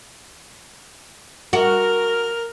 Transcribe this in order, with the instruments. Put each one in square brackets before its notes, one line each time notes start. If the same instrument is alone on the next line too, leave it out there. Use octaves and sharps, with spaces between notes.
[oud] F#4 [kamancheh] A#4 F6